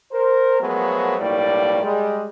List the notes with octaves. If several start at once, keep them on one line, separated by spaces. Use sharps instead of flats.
A#4 C5
F3 F#3 G#3 A3 B3 A#4
B1 A2 G3 A3 A#3 D5
G3 G#3